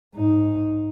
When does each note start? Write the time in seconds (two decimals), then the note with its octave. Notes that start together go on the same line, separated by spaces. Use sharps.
0.14 G#2 D#4